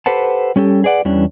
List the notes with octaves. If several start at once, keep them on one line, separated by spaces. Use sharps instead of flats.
G4 A4 B4 C5 F#5 A5
G3 C#4 G4 A4
G#4 B4 D5 F#5
E2 E3 G3 C#4 D4